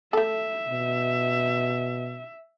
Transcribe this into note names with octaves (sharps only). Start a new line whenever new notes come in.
A3 A4 E5
B2